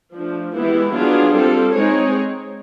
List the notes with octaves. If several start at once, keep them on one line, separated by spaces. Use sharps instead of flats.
F3 A3 D4
E3 G#3 B3 E4 G4
F#3 B3 D4 F4 G#4
G3 C4 F4 A4
G#3 C4 D#4 G#4 C#5